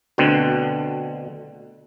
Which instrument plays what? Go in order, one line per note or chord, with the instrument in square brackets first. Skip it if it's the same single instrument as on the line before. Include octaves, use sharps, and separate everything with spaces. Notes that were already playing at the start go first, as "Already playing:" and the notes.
[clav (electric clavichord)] D2 B2 D3 C4